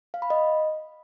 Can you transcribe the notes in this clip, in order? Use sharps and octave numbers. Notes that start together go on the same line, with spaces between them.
F5
B5
D#5